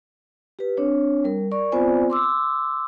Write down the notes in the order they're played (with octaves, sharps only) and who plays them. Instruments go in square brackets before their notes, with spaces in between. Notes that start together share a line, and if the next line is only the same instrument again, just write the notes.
[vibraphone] G4 B4
C4 D4 C#5
G3 A#4
A#4 D5 C#6
B3 C4 F4 C5 D5 G#5
C6 D6 E6